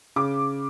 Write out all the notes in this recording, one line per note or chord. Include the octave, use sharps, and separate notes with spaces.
C#3 D6